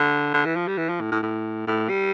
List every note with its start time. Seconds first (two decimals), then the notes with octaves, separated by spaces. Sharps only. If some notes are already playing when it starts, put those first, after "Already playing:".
Already playing: D3
0.34 D3
0.45 E3
0.56 F3
0.68 G3
0.78 E3
0.89 F3
1.01 A2
1.12 A2
1.23 A2
1.67 A2
1.89 G3